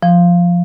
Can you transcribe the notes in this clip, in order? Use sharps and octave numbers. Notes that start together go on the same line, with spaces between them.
F3